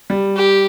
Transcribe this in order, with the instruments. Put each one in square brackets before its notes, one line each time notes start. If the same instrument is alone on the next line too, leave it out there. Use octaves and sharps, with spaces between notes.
[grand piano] G3
[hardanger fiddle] G4